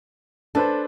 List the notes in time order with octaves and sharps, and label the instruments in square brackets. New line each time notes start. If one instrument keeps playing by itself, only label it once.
[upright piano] D4 B4 C5 [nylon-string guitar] A4